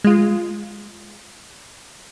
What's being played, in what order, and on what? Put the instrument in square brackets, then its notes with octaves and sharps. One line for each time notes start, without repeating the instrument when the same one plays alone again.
[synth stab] G#3 F4